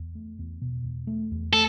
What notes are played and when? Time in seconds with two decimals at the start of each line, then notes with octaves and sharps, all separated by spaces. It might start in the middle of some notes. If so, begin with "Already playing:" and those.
Already playing: E2
0.15 A3
0.39 E2
0.62 B2
0.84 E2
1.07 A3
1.31 E2
1.53 A3 A4